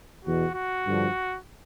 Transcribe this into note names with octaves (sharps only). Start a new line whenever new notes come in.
E2 B2 F#4
F#4
G2 D3 F3